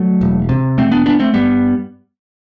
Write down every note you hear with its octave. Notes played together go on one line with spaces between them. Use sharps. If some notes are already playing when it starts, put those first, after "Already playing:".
Already playing: F#3 A3
E1
C3
E1 A3 C4
B3 D4
D2 B3 D4
A3 C4
G2 G3 B3